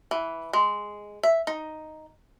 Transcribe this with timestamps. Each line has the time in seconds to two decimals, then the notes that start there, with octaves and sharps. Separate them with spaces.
0.11 E3
0.53 G#3
1.23 E5
1.47 D#4